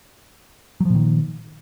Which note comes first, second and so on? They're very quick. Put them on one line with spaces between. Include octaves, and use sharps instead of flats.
F#3 F3 A#2 D#3